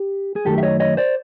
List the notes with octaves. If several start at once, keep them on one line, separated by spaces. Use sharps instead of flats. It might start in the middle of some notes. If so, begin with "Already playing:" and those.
Already playing: G4
G#4
F#2 D#3 F#3 A3 G4 A4
E5
C#5 D#5
C#5 D#5
C5 D5